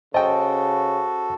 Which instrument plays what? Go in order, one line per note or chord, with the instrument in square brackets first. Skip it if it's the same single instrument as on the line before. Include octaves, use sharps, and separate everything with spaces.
[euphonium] C#3 [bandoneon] F#4 A4 [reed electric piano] C5 A5 [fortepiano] D#5 G5